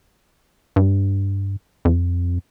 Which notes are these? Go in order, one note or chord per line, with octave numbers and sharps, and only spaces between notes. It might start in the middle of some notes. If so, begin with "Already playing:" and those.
G2
F2